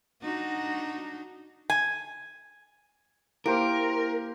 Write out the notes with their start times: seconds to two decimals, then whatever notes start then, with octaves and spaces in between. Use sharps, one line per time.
0.23 D4 D#4 F#4
1.70 G#5
3.46 A#3 E4 G4 A#4 C5 D7